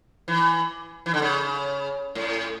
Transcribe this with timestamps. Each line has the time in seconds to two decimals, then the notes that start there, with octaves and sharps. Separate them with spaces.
0.28 E3
1.06 E3
1.14 D3
1.22 C#3
2.15 A2